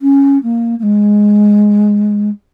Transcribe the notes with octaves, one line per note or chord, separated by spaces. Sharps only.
C#4
A#3
A#3
G#3